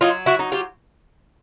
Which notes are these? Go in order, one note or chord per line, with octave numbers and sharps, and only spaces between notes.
F#3 D#4 F4
E4 F#4
D#4
F4 G4